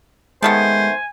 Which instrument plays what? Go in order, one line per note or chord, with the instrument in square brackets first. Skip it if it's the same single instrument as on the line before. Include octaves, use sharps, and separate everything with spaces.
[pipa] D#3 A3 B3 [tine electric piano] G#3 [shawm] C5 [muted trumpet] G#5